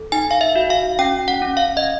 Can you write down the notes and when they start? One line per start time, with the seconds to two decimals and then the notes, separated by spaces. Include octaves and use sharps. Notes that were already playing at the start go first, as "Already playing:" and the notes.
Already playing: A4
0.12 D#4 G#5
0.31 F5
0.41 E5
0.55 F#4
0.70 F5
0.99 C#4 G5
1.28 F#5
1.42 C#4
1.57 F5
1.77 D#5